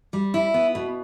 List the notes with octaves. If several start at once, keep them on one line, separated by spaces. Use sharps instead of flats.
G3
E4
B3
B2